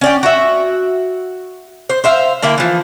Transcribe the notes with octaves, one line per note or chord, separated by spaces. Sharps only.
C#4 D5 G5
F#4 E5
C5
C5 E5 F5
D3 A#3 E4 G4
E3 F3